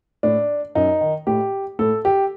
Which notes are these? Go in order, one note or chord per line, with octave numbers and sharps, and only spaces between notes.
A2 D4
F#2 D#4
D#3
A2 G4
A2 A4
G4